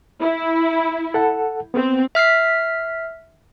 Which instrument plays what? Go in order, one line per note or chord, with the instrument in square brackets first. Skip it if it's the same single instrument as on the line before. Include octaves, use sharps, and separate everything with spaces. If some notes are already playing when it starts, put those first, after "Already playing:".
[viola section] E4
[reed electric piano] A4 F#5 A5
[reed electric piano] B3 [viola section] C4
[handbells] E5 F6 B6 C7